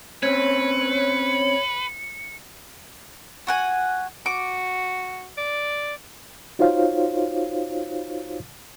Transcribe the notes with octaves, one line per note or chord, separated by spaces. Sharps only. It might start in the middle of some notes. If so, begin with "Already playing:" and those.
C4 C#4 B4 C#5 C#7
F#4 F#5 G#5
F#4 D6
D5
D#4 F4 F#4 C5 C#5 F5